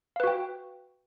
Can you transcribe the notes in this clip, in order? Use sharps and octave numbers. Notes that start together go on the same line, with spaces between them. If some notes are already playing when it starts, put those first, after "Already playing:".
F#4 B4 F5 G5